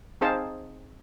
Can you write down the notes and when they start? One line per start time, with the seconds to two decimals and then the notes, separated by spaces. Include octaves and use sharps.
0.21 C4 D#4 G#4 C5 F5 A5